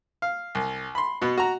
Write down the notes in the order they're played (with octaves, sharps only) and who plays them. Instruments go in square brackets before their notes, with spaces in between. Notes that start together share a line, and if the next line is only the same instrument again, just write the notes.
[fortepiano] F5
C2
B5 C6
B2 B3
F#4 A#5